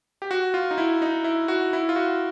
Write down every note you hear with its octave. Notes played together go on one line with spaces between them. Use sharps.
G4
F#4
F4
D#4
E4
D#4
E4
F#4
E4
F4
F#4